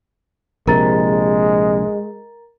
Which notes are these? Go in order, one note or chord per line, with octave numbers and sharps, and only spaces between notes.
A#1 C3 G#3 A#4 A#5 A6